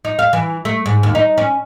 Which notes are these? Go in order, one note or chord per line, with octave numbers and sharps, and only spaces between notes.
D#4
F5
E3
A3
G#2
D#2
D#4
C#4